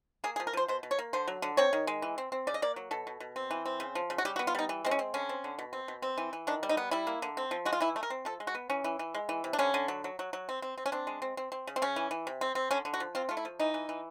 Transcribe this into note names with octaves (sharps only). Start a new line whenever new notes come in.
A#3 G#4
G#4
F3
A#4
F3 C5
B2 C5
B2
C#5
A#3
D3 C5
F#3
D3
C4 C#5
D#3
G#3
E3
C4
C4
C#3 D5
D#5
A#3 D5
F#3
B2 A4
B2
B2
C4
E3
C4
C#3
F3
C#3
F#4
G3 G4
F#4
B3
F4
G3 D#4
E3
G#3 C4
C#4
C4
D3 C#4
C4
D3
B2
C4
B2
C4
E3
E3
D#3 D4
G3
D#4
B3
G3 E4
A#3
D3
C4
F3
G#3 F#4
F4
E3 E4
A3
A#4
C4
F3 A4
G#3
F#4
B3
E3 C#4
E3
E3
G#3
E3
C3
D4
D3 C#4
D3
F#3
F#3
F#3
F#3
C4
C4
C4
C#4
C4 D4
G#3
C4
C4
C4
C#3
C4
C#3 C#4
E3
E3
C3
C4
C4
D3 C#4
D3
F#4
F3
C4 F4
A3 F4
E4
F3
E3 D#4
E3
E3